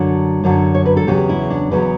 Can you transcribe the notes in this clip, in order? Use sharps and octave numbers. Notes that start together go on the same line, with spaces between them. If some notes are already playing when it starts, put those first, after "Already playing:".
Already playing: F#2 D3 F#3 A4
F#2 D3 F#3
C#5
B4
A4
E2 C#3 F#3 G4
E4
D4
E2 C#3 F#3 B4